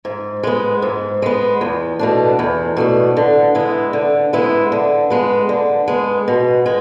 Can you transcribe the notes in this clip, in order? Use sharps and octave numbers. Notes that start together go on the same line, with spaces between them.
G#2
G#3 B3
G#2
G#3 B3
E2
B2 A3 D4
E2
B2 A3 D4
D3
G#3 B3 E4
D3
G#3 B3 E4
D3
G#3 B3
D3
G#3 B3
B2
G#3